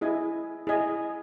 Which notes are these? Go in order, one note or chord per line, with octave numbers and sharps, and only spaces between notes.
E4 G#4 D#5 G#5
E4 G#4 D#5 G#5